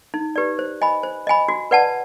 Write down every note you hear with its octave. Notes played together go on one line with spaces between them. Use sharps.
D#4
G4 B4 D5
C5
D#5 G#5 B5
C5
D#5 G#5 B5
F#4
B4 D5 F#5 A5